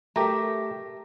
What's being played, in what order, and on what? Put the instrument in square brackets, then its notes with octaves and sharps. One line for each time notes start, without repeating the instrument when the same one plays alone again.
[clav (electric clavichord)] A3 G4 [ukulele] A#4 E5